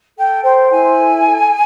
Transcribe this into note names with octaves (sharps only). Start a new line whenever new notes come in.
A4 G5
C5 G5
E4 G#5
A4
A4